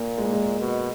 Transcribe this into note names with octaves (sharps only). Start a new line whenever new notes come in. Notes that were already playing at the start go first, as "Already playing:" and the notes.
Already playing: A#2 A#3
G#3
A#3
G#3
B2